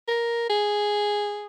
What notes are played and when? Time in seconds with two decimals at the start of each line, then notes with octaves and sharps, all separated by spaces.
0.08 A#4
0.50 G#4